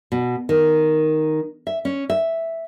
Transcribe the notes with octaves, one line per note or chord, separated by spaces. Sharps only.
B2
D#3
E5
C#4
E5